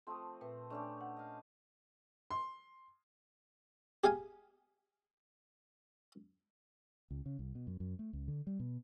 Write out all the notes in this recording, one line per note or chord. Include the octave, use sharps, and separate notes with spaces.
F3 A3 C4 C6 D#6
A#2 C4 B4 E5
A3 C#4 D4 G4 D5
D4 F#5
D#5 F5
C6
G4 G#4 F5 G#5
C#2
C#3
C2
B2
F#2
F#2
A3
C#2
D3
G3
B2